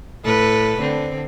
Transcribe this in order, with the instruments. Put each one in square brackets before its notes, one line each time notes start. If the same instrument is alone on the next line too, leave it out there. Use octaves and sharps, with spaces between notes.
[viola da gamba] A2 A4 B4
D3 C4